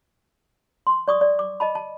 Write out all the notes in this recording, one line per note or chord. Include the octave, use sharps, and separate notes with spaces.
C6
D5 C#6 D#6
D5
D6
D#5 A5 B5
A5